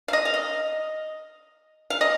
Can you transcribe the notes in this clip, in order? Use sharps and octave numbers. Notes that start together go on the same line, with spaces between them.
F5
D#5
F5
D#5
F5
D#5